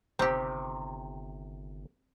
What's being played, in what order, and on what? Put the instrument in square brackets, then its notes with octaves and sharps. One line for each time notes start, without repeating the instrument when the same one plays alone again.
[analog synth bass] G1 [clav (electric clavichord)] C3 D#3 [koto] C4 G4